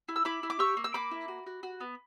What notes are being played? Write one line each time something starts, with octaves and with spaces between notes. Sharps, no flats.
E4
E6
E4 B5 D6
E4
D6
G4 C#6 E6
A#3
E6
A#3 B5 D6
E4
F#4
F#4
F#4
B3